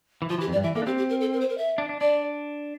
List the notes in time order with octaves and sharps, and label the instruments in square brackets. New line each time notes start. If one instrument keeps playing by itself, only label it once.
[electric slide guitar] E3
[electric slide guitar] F3 [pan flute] F4
[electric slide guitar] E3 [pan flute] G4
[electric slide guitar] F2
[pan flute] D5
[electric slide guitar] G2
[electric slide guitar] E3 [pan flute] E5
[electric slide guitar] A#3 [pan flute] A4
[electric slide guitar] D4
[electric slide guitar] C4 [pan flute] G4
[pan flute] G4
A#4
A4
A#4
C5
A#4
E5
[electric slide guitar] D4
D4
[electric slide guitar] D4 [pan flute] D5